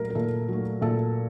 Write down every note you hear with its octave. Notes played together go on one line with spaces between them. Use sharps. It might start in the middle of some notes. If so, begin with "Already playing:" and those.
Already playing: A#2 F#3 A3 A#4
A#4
A#2 A4
F#3 A3
A#2 A4